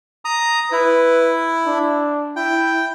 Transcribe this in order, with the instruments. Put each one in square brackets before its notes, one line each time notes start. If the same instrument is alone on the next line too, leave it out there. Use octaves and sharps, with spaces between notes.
[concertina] A#5 D#6
[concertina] E4 [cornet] B4
[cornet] D4
[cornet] E4 [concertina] G5